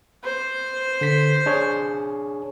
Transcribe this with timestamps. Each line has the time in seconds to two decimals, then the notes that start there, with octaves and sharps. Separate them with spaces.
0.25 C5
1.01 D3 B6
1.46 D4 G#4 C#5